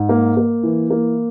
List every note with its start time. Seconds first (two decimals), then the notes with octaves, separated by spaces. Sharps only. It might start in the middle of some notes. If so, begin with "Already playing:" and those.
Already playing: G#2
0.09 A#3
0.37 A#3
0.63 E3
0.90 A#3